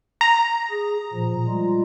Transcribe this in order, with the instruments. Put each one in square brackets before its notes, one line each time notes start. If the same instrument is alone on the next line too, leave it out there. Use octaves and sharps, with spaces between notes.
[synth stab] A#5
[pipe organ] G#4
A#2 F3
G3 G#3 F4